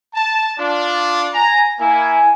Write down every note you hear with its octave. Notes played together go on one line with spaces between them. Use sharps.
A5
D4 F4
G#5 A#5
A#3 E4 G#5